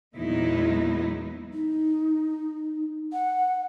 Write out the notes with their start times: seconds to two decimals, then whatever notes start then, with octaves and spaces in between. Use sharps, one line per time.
0.16 E2 A#2 F#3 G#3 D#4 E4
1.54 D#4
3.13 F#5